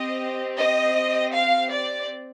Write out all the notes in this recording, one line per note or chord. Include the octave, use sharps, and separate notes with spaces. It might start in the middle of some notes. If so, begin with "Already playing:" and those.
Already playing: C4 G4 D#5
D#5
F5
D5